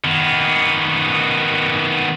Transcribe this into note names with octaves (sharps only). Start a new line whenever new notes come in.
D#3 B3